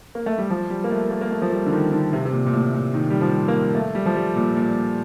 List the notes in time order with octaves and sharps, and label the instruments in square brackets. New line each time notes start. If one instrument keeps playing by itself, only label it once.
[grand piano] A#3
A3
G3
F3
G3
A#3
A3
A#3
A#3
A3
F3
G3
D3
D#3
D3
C3
C3
A#2
A#2
A2
A#2
D#3
G3
F3
A#3
A3
G3
F3
G3
A#2
A#2